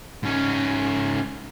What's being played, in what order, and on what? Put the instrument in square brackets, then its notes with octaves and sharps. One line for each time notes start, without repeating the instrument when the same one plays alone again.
[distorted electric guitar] G#2 C#4